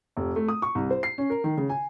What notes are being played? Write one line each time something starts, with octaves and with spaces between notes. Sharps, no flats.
F1
A3
D#6
C#6
C2
C5
C7
C#4
A#4
D#3
C#3
G#5